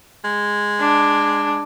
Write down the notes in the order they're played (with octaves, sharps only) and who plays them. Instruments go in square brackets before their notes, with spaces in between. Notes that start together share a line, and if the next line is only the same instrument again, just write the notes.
[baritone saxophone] G#3
[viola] D4